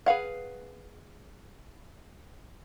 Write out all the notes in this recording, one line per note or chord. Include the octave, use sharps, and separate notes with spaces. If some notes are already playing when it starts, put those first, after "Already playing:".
G#4 B4 F5 F#5